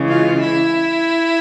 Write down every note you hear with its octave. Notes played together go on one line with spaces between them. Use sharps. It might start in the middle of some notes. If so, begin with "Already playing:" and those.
Already playing: C#3 E3 G#3
F4
E4